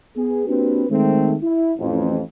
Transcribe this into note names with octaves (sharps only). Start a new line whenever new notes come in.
B3 G#4
A#3 C4 D4 F#4 G4 B4
D#3 G#3 A3 C4
E4
A1 F2